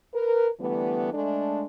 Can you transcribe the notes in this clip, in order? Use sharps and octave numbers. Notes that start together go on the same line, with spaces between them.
A#4 B4
D3 E3 G3 A3 B3
G#3 A3 D4